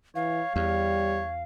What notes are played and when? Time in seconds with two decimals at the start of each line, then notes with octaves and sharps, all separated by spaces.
0.15 E3 C#5 F5
0.56 E2 G3 C#5